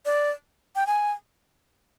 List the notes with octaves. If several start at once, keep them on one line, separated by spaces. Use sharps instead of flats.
D5
G5
G#5